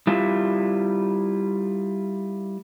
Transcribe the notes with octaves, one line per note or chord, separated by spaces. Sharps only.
G3 E4 F4